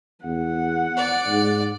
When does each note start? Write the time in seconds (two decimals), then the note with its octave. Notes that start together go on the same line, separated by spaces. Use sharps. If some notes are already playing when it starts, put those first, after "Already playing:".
0.24 E2 F#5
0.97 D5
1.28 G#2